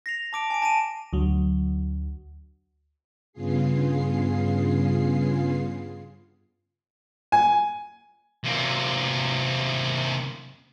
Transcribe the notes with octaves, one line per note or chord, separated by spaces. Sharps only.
A#6 C7 F7
A5 D6 D7
G#5 D7
A5 D7 D#7
D2 F#3
G2 C#3 B3 F4 G#4 C7
G#5
C3 A#3